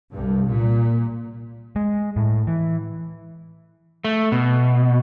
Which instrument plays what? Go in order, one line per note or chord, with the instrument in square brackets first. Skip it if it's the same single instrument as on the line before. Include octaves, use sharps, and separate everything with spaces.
[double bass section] C2 G2
A#2
[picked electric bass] G#3
A2
E3
[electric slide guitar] A3
B2